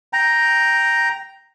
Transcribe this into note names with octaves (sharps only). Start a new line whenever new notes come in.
G5 A#5